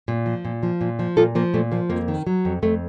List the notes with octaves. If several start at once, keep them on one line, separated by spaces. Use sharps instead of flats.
A#2
F3
A#2
F3
A#2
F3
A#2 F4 A4
F3 A#3
A#2 A3
F3 A#3
F2 A#3
D#3
F#3
F2
F2 A3